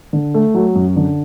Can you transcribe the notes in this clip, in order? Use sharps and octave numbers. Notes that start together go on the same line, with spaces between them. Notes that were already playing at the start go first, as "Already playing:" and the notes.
D3
A3
F#3
F#2
D3